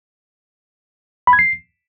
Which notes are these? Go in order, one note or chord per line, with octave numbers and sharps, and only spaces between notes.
B5
G#6
C7